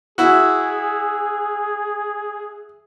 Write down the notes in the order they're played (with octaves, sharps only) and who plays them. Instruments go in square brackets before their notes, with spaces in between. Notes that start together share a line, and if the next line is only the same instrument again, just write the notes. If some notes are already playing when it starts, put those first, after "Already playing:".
[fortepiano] E4 F#4 [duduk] G#4